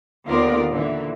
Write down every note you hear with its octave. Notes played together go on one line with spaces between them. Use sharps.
D#2 D3 B3 F4 A#4 D5
A#2 D3 E3